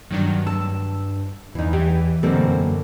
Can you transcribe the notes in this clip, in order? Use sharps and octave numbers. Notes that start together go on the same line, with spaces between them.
G2 D#3 F#3 D4
A5 E6
E2 E3 D#4
E3 G4
F#2 B2 D3 A#3 C4 G4 A4